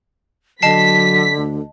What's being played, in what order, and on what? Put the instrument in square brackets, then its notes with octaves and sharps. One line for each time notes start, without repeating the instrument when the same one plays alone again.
[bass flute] D3 [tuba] F#3 [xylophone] D#5 A5 C7 [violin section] B6
[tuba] D2